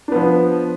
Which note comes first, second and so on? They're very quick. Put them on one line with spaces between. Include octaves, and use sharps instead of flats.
D4 B3 F3